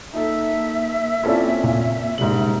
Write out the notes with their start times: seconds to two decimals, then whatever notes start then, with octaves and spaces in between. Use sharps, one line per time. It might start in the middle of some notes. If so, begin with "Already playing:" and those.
0.14 A#3 D#4 A4 E5
1.23 C4 C#4 E4 F4 A4 D5
1.64 A#2
2.18 E1 G#2 C#3 G3 F#7